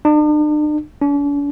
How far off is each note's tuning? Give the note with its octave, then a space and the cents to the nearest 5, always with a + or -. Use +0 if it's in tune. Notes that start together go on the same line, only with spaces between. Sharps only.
D4 +45
D4 -45